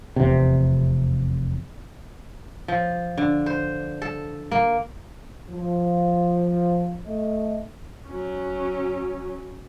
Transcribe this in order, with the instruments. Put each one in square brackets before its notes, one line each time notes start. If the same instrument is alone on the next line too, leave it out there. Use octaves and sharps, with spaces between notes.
[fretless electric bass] F1 E2 C3
[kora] F3
D3
C5
A4
A#3
[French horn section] F3
A3 D#5
[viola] F#3 C#4